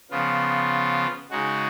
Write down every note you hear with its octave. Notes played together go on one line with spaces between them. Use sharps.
C#3 F3 B3 F4
C#3 G#3 D#4 F#4